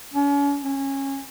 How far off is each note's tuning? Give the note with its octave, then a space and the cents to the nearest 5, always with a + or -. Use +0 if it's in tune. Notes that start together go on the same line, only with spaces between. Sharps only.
C#4 +40
C#4 -20